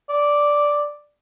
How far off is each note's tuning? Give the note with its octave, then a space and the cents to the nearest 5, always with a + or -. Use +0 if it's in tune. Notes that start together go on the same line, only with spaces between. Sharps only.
D5 -5